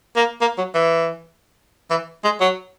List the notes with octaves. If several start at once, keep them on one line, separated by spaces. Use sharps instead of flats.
A#3
A#3
F#3
E3
E3
G#3
F#3